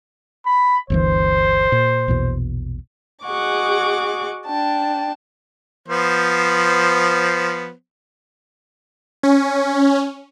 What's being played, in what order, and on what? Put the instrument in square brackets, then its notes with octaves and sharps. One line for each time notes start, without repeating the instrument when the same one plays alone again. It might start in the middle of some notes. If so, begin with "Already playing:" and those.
[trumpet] B5
[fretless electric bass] G1 D2 E3 [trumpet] C5
[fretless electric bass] A#2
A#1 E2 B2
[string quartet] F#4 G#4 D#5 F#5 C#6 D6
D4 G5 A5
[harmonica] F3 B3 C5
[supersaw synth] C#4